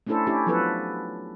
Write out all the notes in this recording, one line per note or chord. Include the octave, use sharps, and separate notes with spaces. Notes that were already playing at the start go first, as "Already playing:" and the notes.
A3 C#4 D4 E4 A4 C5
C#4 D4 E4 G4
F3 F#3 B3 E4 A4 B4